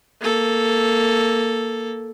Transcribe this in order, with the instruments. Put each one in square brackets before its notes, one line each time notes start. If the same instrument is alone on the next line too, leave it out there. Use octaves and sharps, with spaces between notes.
[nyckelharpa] A#3 A4